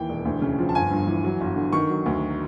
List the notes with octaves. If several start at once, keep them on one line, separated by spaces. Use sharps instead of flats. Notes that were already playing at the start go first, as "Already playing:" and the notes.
Already playing: D#2 E3 G5
E1
D2
C#3
F3
A5
G1 G#5
G2
E3
F#3
G1
D3
D#3 C#6
F#3
D2